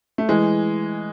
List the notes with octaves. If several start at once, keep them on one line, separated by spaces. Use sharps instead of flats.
A3
E3 G#3